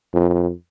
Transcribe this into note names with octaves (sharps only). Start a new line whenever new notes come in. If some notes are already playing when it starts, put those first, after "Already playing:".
F2